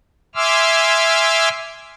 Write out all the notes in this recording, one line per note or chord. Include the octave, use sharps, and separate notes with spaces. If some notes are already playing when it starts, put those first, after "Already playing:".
E5 G#5 C6 D6 E6 F6